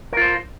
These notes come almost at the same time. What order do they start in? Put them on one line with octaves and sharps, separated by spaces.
A#4 F4 C5